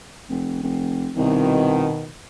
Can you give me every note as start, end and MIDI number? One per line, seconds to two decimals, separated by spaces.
0.29 0.62 29
0.63 1.11 29
1.17 1.88 36
1.17 2.07 47
1.17 2.07 51